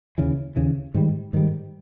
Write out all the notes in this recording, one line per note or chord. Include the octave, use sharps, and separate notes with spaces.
D#2 C#3 E3
D#2 C#3 E3
G#2 D#3 G3
G#2 D#3 G3